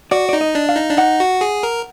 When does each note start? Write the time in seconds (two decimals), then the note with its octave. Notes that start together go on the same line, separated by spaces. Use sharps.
0.11 F#4 D5
0.29 D#4 D5
0.41 D#5
0.55 D4
0.69 F5
0.76 D#4
0.89 D4
0.98 D#4 F#5
1.20 F#4
1.41 G#4
1.63 A#4